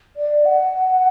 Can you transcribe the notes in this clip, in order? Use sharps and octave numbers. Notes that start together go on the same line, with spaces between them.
D5
F#5